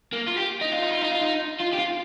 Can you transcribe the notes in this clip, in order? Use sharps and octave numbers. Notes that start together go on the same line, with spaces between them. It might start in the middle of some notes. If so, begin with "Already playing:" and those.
A#3
F4
G4
D#4
F4
D#4
F4
D#4
F4
D#4
F4
G4
F4